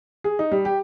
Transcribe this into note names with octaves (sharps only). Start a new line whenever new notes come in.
G#4
D#4
G3
G4